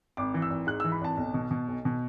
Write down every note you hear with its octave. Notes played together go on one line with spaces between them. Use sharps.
G#1 D6
E3
E6
G#1
G#2 F#6
E6
E3
B5
G#1 A5
B1
B2
B2
B1
B2